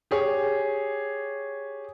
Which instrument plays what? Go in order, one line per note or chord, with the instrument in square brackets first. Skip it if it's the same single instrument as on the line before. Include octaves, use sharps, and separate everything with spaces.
[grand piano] G4 G#4 C#5